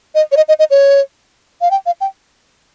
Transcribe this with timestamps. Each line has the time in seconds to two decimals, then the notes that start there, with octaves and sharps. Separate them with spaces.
0.15 D#5
0.32 C#5
0.37 D#5
0.48 D#5
0.59 D#5
0.70 C#5
1.61 F5
1.71 G5
1.86 F5
2.01 G5